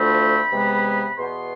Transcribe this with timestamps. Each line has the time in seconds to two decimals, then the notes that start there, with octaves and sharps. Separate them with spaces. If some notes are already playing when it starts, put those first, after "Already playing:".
Already playing: D2 D3 F3 A3 C4 B5
0.52 E2 C3 G#3 B3
1.17 E2 B2 B3 C6